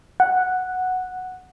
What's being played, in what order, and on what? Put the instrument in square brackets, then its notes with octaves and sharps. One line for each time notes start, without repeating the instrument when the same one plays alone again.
[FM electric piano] F#5